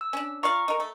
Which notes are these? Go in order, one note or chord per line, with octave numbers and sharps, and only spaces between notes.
E6
C#4 D4
F4 D5 F5 A#5 C#6
D#4 A#4
A3